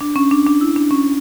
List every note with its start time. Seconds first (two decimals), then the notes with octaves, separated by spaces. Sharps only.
0.01 D4
0.16 C#4
0.31 D4
0.47 D4
0.61 E4
0.76 D4
0.91 C#4